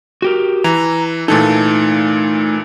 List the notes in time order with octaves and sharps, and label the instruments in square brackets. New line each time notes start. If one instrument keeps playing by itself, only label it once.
[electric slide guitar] F#4 G4 A#4
[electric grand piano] E3 [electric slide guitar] A#5
[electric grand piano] A#2 E3 A4 [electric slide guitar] A3 D#4